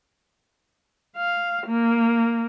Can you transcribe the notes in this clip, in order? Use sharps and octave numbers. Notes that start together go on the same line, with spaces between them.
F5
A#3